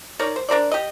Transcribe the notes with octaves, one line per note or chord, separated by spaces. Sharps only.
D#4 A#4 C#5 D5
C5
D4 A#4 C5 D5
G4 D#5